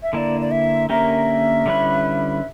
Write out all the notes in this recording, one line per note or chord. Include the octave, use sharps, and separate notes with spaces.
E5
D3 A#3 E4 D5 E5
D5
E5
D3 A#3 C#4 G4 A#4 E5
D3 G3 C#4 E4 B4